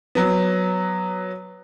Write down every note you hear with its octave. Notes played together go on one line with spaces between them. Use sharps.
F#3 B3